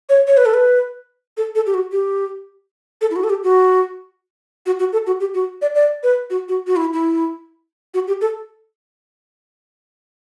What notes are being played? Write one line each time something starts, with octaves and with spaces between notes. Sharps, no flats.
C#5
C#5
B4
A4
B4
A4
A4
G4
F#4
G4
A4
E4
F#4
A4
G4
F#4
F#4
F#4
A4
F#4
G4
F#4
D5
D5
B4
F#4
F#4
F#4
E4
E4
F#4
G4
A4